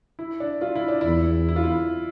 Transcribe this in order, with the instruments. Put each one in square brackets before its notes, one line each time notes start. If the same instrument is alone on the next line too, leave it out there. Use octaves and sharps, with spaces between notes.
[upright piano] E4
D4
F4
E4
D4
[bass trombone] E2 [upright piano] E4
[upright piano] E4
F4
E4